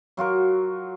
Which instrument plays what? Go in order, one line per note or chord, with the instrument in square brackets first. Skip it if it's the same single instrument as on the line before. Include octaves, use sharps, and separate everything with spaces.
[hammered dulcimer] F#3 F4 F#4 A#4